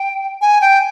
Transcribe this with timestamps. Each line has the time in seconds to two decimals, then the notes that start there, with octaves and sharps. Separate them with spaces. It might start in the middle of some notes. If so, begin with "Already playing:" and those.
Already playing: G5
0.41 G#5
0.61 G5